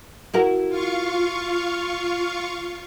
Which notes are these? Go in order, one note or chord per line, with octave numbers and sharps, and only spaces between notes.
E4 F#4 A#4
F4 F5 C#6